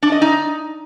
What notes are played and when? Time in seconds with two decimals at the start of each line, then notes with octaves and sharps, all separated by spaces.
0.03 D4
0.12 D#5
0.22 D#4